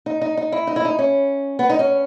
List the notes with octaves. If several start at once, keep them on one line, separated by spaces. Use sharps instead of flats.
D#4
D#4
D#4
E4
D#4
E4
D#4
C#4
B3
D#4
C#4